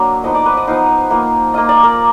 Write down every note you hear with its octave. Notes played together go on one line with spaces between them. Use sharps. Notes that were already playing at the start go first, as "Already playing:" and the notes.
Already playing: F#3 A#3 D4
F3 B3 D#4 D#5
D5
B4
D#5
F3 B3 D#4 F5
A#3 F4
A#3 F4 D#5
D5
A#4